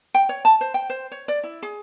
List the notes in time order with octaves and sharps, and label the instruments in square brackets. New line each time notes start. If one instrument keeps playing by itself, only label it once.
[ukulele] G5
C#5
A5
C5
G5
C5
C#5
D5
E4
G#4